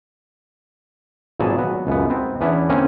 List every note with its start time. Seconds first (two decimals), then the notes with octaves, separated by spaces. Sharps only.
1.40 G#1 A#2 F#3 B3 G#4 A5
1.58 F#3 B3
1.87 C#2 F#2 B3
2.10 B3 C4 D#4
2.41 E2 B3 C#4 D4 E4
2.69 D3 A#3 C4 C#4